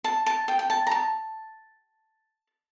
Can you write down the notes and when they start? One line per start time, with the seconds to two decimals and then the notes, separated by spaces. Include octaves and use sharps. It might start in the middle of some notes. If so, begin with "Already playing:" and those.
0.04 A5
0.26 A5
0.48 G5
0.59 G5
0.70 A5
0.87 A#5
0.91 A5